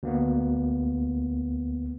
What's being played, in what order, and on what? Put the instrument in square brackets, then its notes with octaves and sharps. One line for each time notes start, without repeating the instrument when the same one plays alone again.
[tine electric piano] D2 A#3 B3